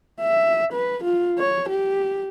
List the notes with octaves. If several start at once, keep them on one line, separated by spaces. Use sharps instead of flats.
E5
B4
F4
C#5
G4